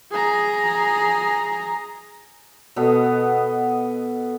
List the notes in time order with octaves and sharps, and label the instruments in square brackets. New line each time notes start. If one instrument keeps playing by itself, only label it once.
[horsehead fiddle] G#4 A#5
[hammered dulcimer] B2 B3 A4 D#5